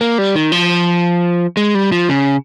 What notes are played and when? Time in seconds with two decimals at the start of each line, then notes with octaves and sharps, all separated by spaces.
0.01 A#3
0.18 G3
0.35 D#3
0.52 F3
1.57 G#3
1.75 G3
1.92 F3
2.09 C#3